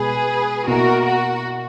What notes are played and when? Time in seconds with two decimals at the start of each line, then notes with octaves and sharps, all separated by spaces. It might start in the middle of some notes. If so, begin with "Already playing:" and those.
Already playing: B2 G#3 G#4 B4
0.67 B2 A#3 E4 F#4 A#4
1.07 F#4